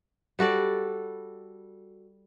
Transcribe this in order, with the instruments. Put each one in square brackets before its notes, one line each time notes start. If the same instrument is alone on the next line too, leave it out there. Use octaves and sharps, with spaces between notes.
[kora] G3 F#4 A4 D5